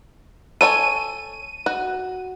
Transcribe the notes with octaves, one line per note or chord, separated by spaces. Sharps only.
A4 C#5 G#5 D#7
F#4